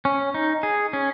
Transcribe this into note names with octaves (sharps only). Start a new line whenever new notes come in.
C#4
D#4
G#4
C#4